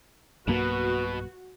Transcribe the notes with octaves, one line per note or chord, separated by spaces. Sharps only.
B1 G2 B2 A#3 F#4 B4